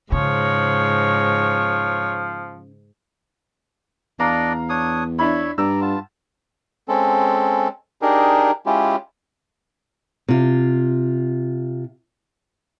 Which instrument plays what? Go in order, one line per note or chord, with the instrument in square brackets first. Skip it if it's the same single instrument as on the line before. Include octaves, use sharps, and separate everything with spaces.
[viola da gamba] G#2 [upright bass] C#3 [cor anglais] F3 [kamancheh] C#5
[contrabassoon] E2 [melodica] D4 D5 D#5 [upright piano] F5 A#5
[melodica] D4 C#5 D#6
[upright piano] D4 E4 B5 [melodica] C#5 E5
[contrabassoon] G2 [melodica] D5 A#5 [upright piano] E6
[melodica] B3 F4 A5
[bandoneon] G#3 C4 C#4 A4
D4 D#4 G4 G#4 A#4
G#3 C#4 E4 F4 G4
[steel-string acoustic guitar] C3 F4